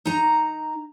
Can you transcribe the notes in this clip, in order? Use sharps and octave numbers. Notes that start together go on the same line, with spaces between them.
D#4 A#5